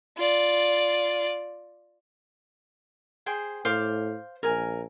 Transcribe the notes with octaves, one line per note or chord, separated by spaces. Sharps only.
F4 D5
G#4 C5 G5
A2 C5 F5 D6
A#1 A#4 G#5